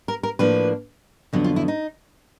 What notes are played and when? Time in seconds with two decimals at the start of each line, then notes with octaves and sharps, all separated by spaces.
0.08 A#4
0.23 A#4
0.39 A2 F3 A#3 D4 B4
1.33 F2 D3 F#3 B3
1.44 F4
1.56 E4
1.68 D#4